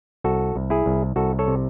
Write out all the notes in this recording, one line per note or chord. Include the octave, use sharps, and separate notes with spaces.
C2 F#4 A4
C2
E4 G#4
C2
C2 F#4 A4
A4 C#5
C3